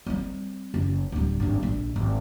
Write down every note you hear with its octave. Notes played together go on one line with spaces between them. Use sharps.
G3 C4
F#1
D1 G3
G#1 G2
A#1
G#1